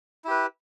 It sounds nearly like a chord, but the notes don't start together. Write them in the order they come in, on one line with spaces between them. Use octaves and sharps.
E4 G4 B4